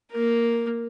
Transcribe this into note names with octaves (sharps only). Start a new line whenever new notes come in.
A#3 A#4